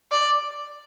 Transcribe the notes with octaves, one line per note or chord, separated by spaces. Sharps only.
D5